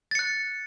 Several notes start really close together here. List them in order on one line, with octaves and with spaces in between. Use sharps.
A6 C#7 F#6